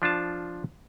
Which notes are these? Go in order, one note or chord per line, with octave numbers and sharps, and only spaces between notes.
F3 D4 F4 A5